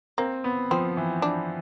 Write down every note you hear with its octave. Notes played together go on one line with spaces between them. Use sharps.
A#3 C4
B3
F3 C4
E3
D4